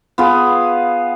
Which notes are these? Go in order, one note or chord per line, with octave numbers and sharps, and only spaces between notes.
B3 F4 G#4